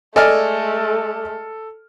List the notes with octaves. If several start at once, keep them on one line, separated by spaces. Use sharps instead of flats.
G#3 A3 A4 D5 D#5 G#5 F6